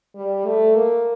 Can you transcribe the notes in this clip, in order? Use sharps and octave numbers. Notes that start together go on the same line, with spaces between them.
G3
A3
A#3